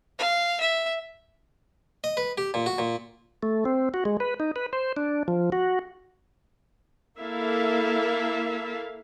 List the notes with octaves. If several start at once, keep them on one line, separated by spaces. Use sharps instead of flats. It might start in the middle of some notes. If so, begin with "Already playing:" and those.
F5
E5
D#5
B4
G4
A#2
F#4
A#2
A3
C4
F#4
G#3
B4
D#4
B4
C5
D4
F3
F#4
A#3 E4 A4 E5 F5